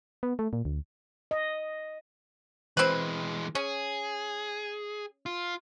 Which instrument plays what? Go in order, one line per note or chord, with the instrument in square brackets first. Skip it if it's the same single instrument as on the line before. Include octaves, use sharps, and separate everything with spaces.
[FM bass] B3
A3
A#2
D2
[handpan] D#5
[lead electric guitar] E3 G#3 [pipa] C4 B4
[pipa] C#4 [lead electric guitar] G#4
[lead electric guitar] F4